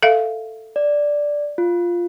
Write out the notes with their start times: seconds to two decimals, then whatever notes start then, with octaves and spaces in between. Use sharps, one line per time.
0.03 A4 E5 F5
0.76 D5
1.58 F4